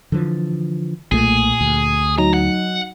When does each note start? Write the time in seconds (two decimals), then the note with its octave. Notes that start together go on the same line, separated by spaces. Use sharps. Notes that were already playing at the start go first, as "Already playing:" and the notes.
0.12 D3 E3 F3
1.12 B1 A#2 A3 A#3 G#4
1.61 D2
2.18 F#3 D#4 A#5
2.34 F#5